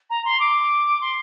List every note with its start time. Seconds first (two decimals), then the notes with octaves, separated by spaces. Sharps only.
0.09 A#5
0.24 C6
0.39 D6
1.01 C6